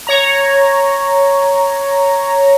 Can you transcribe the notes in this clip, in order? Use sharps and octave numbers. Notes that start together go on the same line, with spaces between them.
C#5 A#5